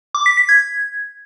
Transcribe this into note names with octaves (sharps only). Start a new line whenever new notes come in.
D6
B6
B6
G#6